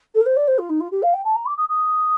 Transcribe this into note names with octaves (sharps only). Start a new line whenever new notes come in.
A4
A#4
C5
D5
C5
F4
D#4
F4
G4
F5
G5
A5
A#5
D6
D#6
D#6